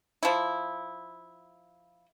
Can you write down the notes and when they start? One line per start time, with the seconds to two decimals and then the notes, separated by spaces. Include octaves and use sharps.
0.23 F3 E4